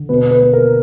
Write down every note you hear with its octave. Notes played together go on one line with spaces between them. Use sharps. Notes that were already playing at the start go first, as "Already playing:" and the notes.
Already playing: D3
B2 B4
B4
A#3
A#4